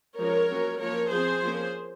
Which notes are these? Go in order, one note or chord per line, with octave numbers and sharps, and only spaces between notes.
F3 G#3 C#4 A#4 C#5
F#3 A#3 C#4
F3 A#3 C#4 A#4 C#5
F3 C4 G#4 C5
F3 A#3 C#4